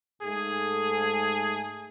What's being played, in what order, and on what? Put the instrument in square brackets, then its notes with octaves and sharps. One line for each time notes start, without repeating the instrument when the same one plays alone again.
[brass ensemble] G#2 A3 A4 [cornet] G#4